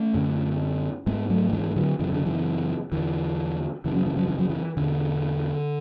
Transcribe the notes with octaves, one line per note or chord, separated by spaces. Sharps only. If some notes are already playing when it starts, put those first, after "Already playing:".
Already playing: A3 C#4
F#2 D3
G#2 G#3 B3
F#3 A3
A3
E3 G#3
G#3
D3 F#3
F#2 C#3 E3
D3
E3
E2 D3 E3
F#2 C#3 E3
F#3
E3
F#3
E3
F#3
E3
E2 B2 D3